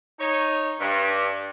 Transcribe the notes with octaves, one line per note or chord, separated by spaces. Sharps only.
D#4 C#5
G2